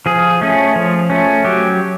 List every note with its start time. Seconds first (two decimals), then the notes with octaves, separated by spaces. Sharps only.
0.06 F3 G#4
0.41 A3 C#4
0.76 F3
1.10 A3 C#4
1.45 F#3 G4